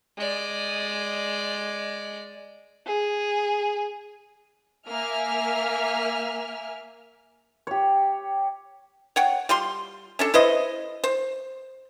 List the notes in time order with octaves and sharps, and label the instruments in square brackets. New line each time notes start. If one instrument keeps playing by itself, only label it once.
[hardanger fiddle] G#3 D5
[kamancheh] G#4
[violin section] A#3 E5 G#5 F6
[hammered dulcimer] G4 C#5
[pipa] C#5 F#5 G5
G3 F4 C6
C#4 D4 A4
E4 B4 C5 D#5
C5